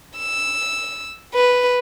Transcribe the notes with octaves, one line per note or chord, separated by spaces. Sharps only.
E6
B4